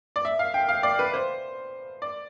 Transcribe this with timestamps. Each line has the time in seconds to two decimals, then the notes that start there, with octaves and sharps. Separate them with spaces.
0.16 D5
0.25 E5
0.39 F5
0.54 G5
0.69 F5
0.83 D5
0.99 B4
1.14 C5
2.02 D5